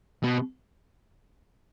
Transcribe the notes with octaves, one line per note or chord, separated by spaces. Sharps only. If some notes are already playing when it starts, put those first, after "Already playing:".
B2